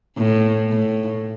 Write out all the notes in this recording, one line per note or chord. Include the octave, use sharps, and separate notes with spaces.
A2
A2